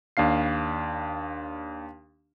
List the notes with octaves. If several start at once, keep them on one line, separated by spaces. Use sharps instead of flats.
D#2 D4 F5 C7